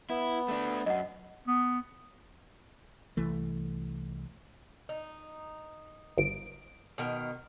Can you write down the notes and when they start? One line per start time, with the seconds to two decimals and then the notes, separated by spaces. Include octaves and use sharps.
0.10 B3 E4
0.48 A3 D4
0.86 F#2 D#5 F#5
1.47 B3
3.17 C2 E3 A3
4.89 D#4
6.18 G1 D7
6.98 B2 D#3 A#4